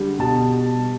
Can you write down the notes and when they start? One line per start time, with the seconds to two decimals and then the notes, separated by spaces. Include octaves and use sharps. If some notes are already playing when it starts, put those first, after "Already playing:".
Already playing: D3 G3
0.19 B2 A5